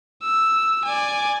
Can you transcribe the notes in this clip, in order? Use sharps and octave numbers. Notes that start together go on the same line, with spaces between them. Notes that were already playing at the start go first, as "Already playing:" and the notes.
E6
D5 G#5